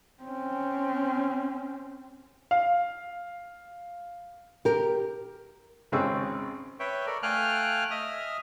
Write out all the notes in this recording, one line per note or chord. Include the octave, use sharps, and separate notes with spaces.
C4 C#4
F5
G4 A#4
G#1 C#3 C4 C#4 G#4 E6
B4 C#5 E5 G5
A4 A#4 D5
A3 F5 G5 G#5 F6 F#6
D#5 E5 D#6 F6